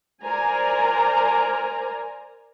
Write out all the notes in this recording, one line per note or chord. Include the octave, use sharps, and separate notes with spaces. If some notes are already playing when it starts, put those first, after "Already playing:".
A#4 C5 D5 G#5 A#5